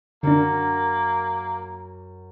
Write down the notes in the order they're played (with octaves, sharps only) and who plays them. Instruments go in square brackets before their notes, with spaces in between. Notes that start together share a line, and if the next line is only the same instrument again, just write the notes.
[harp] F#2 [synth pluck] D3 D4 [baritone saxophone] A#3